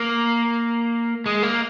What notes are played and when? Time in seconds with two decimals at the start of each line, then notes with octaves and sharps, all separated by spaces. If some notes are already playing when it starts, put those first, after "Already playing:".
Already playing: A#3
1.26 G#3
1.43 A#3